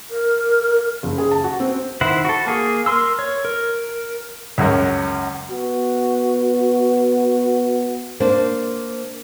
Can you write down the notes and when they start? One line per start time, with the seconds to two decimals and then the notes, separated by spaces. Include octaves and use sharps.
0.10 A#4
1.03 F#1
1.18 G#4
1.31 A5
1.44 F#4
1.60 C4
2.01 D#3 E4 C5 F#5
2.25 F#4 A4
2.47 A#3 G#4
2.86 A#4 C6 E6
3.19 C#5
3.45 A#4
4.58 C#2 F#2 C#4 A#4 F#5
5.51 B3 F#4
8.20 A#3 D4 C5